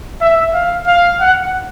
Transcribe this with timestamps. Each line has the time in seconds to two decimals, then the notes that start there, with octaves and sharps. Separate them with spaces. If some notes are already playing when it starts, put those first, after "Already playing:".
0.21 E5
0.54 F5
0.87 F5
1.20 F#5